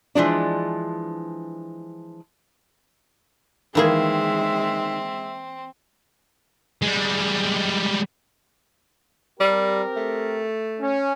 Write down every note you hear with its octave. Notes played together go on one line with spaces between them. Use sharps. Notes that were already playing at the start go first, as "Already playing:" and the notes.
E3 F3 G#3 D4
D#3 E3 G#3 A#3 C4 G#4 E5
G3 G#3
G3 C4 G4 A#4
A3
C#4